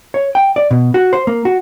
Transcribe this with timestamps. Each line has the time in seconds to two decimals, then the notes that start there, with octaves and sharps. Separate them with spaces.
0.14 C#5
0.35 G5
0.56 D5
0.71 B2
0.94 F#4
1.13 C5
1.27 A#3
1.45 F#4